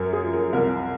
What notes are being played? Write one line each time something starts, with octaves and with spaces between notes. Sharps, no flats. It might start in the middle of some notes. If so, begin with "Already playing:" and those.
Already playing: F#2 A#4
G#4
F3
A#4
C2 A#4